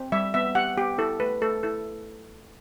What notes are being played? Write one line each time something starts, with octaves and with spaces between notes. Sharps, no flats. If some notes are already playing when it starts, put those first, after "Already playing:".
Already playing: C4
G3 E5
B3 E5
G4 F#5
B3 G4
E4 A4
A3 B4
A3 A4
E4 A4